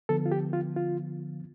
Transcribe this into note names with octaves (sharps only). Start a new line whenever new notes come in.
D3 F3 B3 A4
F4
G4
F4
F4